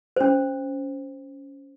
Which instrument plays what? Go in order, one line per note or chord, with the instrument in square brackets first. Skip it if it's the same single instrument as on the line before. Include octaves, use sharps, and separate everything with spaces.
[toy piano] C#4 C5